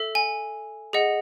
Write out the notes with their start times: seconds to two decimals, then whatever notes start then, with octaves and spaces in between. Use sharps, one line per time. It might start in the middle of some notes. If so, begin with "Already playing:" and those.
Already playing: A4 E5
0.15 G#5
0.93 G#4 D#5 F#5